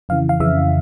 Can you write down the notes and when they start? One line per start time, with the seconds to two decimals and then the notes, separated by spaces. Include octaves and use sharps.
0.09 F2 C#3 E3 F5
0.29 F5
0.40 F2 C#3 E3 E5